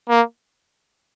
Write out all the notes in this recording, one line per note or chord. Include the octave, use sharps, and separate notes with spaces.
A#3